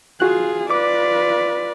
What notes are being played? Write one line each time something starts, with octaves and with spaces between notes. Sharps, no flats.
F4 F#4 G#4 F#6
F4 B4 D5 D6